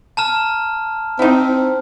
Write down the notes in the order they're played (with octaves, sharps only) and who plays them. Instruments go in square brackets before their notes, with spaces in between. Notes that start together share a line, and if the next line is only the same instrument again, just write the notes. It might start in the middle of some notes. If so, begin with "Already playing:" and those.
[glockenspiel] A5 A#5 F6
[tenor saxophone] C4 [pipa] D#4 E4